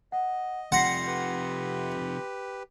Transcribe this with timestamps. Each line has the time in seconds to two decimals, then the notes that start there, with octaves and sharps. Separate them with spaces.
0.12 D#5 F#5
0.72 C3 F3 G3 F#5 C6 A#6 C7
1.07 G4 B4